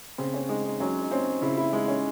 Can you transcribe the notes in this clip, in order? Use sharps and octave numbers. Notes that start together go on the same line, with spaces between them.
C#3 C4
C#4
G#3 D#4
D#4
F#3 C#4
D#4
C4 C#4
C#3 E4
E4
G#3 D#4
C#4